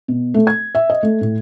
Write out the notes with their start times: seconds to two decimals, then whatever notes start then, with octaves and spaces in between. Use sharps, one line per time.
0.08 B2
0.34 A3
0.47 G#6
0.75 E5
0.90 D#5
1.03 A3
1.21 A2